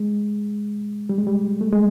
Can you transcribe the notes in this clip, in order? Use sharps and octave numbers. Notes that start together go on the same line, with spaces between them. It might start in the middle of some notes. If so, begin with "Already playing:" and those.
Already playing: G#3
G3
G#3
G3
A3
G#3